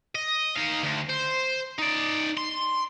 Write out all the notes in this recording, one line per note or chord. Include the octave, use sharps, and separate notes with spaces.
D#5
D#4 F5
D2
C5
D#4 D5
C6